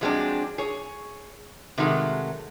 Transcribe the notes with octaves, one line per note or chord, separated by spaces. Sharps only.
F3 F#3 G#3 B3 C4 D4
G#4 C#5
C3 D#3 F#3 G#3 A3